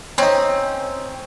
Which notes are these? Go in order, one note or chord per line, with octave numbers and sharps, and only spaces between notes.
C4 C#4 D#4